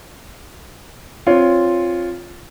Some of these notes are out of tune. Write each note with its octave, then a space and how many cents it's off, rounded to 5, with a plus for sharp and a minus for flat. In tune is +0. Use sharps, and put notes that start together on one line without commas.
C4 +20 F4 +0 C#5 +20